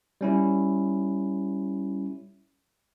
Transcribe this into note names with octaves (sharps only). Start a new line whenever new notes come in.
G3 C#4 E4